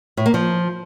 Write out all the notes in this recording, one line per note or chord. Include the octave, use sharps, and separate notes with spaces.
A2
A#3
F3